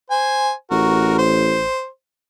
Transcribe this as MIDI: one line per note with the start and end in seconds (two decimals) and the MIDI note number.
0.11 0.52 72
0.11 0.52 80
0.71 1.67 33
0.71 1.18 66
0.71 1.18 70
1.19 1.87 72